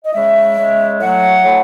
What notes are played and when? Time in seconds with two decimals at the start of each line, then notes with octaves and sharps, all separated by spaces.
0.05 D#5
0.14 C#3 G#3 E5
0.57 C#3 G#3
1.00 A2 F#3 A3 F#5
1.42 A2 F#3 A3